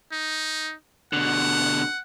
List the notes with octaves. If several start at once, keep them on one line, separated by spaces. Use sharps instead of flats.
D#4
B2 D3 F#5